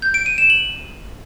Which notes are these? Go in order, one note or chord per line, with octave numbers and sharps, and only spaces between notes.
G6
D7
D#7
E7
F#7